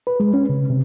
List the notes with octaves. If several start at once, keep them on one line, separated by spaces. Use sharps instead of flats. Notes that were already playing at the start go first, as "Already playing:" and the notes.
B4
G#3
C#4
C#3
C3